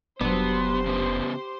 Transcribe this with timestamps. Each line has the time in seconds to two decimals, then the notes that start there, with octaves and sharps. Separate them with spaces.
0.21 F1 F#3 B3 D4 G4 C5 C6
0.86 C#3 B3